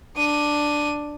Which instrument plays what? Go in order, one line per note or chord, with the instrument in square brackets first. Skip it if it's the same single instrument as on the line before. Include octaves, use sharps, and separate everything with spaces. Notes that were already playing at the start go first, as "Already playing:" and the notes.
[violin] D4 D#7